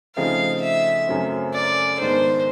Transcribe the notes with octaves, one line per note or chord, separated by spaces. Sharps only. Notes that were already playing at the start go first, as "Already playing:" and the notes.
C#3 F3 A3 C4 D#4 F5
E5
F#2 C#3 F#3 A3 C4
D5
G#2 D#3 G#3 B3 D4 C5